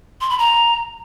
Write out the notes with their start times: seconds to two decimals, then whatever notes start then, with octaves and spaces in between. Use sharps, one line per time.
0.21 C6
0.30 B5
0.38 A#5